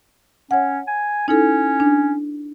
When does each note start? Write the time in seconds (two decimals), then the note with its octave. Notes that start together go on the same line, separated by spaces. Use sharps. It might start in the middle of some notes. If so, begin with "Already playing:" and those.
0.51 C#4 C#5 F#5
0.87 G#5
1.28 C#4 D#4 E4 A4
1.80 D4